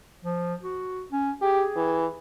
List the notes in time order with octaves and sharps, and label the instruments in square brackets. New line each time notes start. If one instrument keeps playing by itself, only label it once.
[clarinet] F3
F#4
C#4
[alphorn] G4 [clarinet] G#4
[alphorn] E3